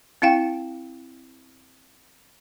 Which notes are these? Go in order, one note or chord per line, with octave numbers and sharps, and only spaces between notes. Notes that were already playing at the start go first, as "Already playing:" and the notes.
C4 E4 F5 G5